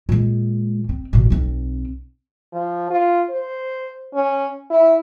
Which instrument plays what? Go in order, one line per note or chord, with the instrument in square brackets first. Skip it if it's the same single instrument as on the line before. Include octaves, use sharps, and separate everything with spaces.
[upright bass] A#2 G#3
C4
A1 B2
B1 C4
[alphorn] F3
F4
C5
C#4
E4